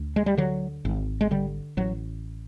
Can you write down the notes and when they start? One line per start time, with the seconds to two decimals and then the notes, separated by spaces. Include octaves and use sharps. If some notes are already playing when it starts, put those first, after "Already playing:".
Already playing: D2
0.16 G#3
0.26 G3
0.37 D3 F#3
0.85 G#1
1.21 G#3
1.31 D3 G3
1.77 A1 F#3